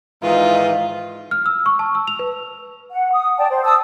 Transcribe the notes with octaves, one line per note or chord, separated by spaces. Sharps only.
G#2 D#3 E3 F4
F6
E6
C#6
A5
E6
F7
B4
F#5
D#6
D5 G5 A5
C5
A5 D#6 E6